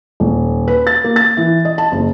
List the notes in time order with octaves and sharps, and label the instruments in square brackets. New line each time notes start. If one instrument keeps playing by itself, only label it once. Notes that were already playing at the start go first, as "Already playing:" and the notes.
[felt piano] D#1
B4
A6
A#3
A6
E3
D#5
A5
F#1